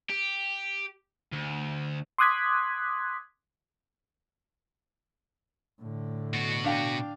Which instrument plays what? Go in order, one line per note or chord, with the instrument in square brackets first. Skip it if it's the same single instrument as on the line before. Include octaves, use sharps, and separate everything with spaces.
[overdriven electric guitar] G4
D2
[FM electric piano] C6 D6 D#6 F#6 G#6 B6
[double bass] A2 D3
[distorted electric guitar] B2 F#4
[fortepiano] D4 F5 G5